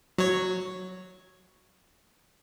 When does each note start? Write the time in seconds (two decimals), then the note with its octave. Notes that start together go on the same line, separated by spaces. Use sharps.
0.18 F#3 C#5